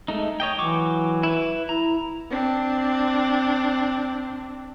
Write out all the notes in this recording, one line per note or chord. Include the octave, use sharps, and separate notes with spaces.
G#3 A3 D#4
C#5 D#5 G5
E3 F#3 C#6 D6
E4 B4
E4 A#5
C4 D4